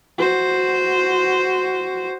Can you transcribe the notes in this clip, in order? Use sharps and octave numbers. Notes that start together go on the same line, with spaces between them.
F#4 C5